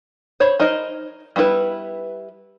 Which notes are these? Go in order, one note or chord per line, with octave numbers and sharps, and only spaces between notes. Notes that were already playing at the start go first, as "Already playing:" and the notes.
C5 C#5 B5
D#4 A#4 C5 D#5
G3 B3 E4 F#4 B4